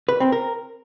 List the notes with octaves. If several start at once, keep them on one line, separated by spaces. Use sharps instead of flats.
B4
C4
A#4